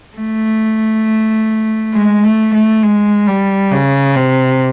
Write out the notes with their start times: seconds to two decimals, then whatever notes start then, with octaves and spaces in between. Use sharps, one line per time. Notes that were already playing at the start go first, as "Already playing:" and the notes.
0.17 A3
1.94 G#3
2.24 A3
2.53 A3
2.83 G#3
3.27 G3
3.71 C#3
4.16 C3